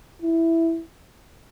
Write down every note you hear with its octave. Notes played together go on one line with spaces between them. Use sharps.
E4